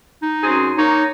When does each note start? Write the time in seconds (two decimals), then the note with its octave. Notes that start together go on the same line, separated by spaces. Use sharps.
0.22 D#4
0.43 F#2 C4 G#4
0.77 A#3 D#4 C#5